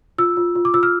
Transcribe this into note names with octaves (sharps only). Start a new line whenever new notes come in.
F4 E6
F4
F4
D6
F4 E6
F6